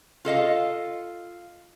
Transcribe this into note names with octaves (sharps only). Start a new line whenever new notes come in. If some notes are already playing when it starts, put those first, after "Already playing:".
F4 A4 D#5 F5